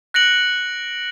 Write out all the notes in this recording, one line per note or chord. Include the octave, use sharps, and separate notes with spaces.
F#6 A#6 C#7 D7 F#7